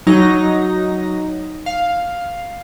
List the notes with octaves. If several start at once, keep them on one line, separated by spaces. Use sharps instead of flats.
F#3 D#4 A#6
F5